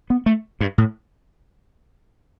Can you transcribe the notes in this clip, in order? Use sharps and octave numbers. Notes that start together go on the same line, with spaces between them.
B3
A3
G2
A2